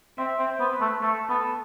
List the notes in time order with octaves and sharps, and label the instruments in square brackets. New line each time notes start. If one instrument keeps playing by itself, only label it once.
[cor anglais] C4 [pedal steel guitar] E5
[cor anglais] C4
[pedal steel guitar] C5
[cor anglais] B3
[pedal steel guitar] B4
[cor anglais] A3
[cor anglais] A3 [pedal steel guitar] A4
[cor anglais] B3 [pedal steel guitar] A4